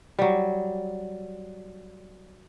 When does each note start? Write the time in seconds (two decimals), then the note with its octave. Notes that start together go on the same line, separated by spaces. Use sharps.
0.19 F#3 G3